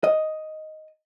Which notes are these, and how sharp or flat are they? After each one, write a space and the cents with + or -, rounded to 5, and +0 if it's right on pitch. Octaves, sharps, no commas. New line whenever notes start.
D#5 +5